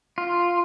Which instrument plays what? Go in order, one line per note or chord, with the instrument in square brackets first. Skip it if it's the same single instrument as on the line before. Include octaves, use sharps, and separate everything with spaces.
[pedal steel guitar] F4